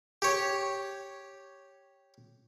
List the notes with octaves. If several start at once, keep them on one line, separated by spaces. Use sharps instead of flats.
G4 C#5